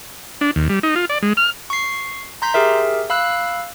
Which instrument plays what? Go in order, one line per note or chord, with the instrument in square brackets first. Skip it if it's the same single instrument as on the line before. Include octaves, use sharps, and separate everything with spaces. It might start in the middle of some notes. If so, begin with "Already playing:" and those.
[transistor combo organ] D4
D#2
G3
D#4
F4
D5
G#3
F6
[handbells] C#6 C7
A#5 C6 G6 B6
G4 G#4 A#4 E5
F5 B5 E6 F#6